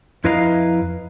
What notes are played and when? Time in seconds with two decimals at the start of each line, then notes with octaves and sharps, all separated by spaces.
0.24 F2 E4 B4 D#5 F5 A#5